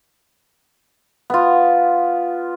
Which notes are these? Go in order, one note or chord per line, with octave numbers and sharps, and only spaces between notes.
B3 F4